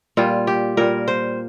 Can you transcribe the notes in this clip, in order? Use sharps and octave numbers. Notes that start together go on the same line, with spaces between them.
A#2 G3 F4
G4
A#2 G3 A#4
C5